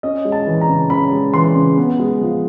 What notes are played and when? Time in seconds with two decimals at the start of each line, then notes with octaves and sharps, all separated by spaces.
0.03 C#4 D#5
0.25 G#3
0.32 A5
0.47 E3
0.61 A#5
0.68 C#3
0.90 C#4 B5
1.12 G#3
1.34 E3 C6
1.56 C#3
1.77 B3
1.99 G#3
2.21 F3